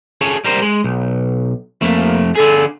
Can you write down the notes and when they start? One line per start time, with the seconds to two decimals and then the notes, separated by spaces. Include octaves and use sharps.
0.21 G#4 A4 C#5
0.44 G3 A#4 C5
0.62 G#3
0.84 B1
1.82 F2 A3 A#3
2.35 D3 G#4 A4